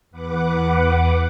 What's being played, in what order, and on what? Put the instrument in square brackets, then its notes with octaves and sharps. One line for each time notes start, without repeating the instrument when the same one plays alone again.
[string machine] E2 B4 F#5 D6